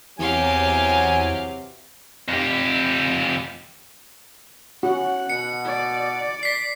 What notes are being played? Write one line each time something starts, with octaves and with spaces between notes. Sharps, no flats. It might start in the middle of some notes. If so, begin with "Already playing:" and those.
E2 C3 E3 F#3 G4 F5 G#5
F2 G4
C#4 F#4 F#5
B2 C#7
D5
B6 C7